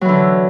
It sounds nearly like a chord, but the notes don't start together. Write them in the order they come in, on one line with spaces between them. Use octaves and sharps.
F#3 E3 D3